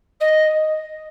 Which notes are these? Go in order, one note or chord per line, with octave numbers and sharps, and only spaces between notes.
D#5